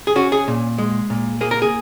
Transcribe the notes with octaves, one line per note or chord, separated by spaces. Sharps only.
G#4
C#4 F#4
G#4
A#2
G#3
A#2
A#3 G#4
A#4
G#4